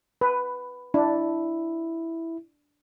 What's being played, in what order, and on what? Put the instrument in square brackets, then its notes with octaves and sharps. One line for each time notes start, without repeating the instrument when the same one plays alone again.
[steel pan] B4
[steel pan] D4 [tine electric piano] E4